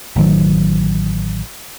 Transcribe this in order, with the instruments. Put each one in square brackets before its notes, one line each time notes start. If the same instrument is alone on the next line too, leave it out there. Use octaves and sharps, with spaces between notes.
[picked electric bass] A1 A2 D#3 F#3